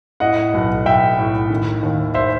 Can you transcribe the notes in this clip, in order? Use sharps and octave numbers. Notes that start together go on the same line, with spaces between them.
A2 D#5 F#5
B1
B1 E5 G5
A2
D#3
D#2
C5 E5